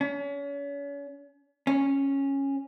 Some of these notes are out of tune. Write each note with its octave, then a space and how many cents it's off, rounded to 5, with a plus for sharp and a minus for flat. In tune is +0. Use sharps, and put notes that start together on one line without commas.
C#4 +35
C#4 -10